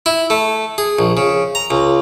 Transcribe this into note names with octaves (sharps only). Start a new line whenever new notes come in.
E4
A3
G#4
A#1
C#3
A#5
C#2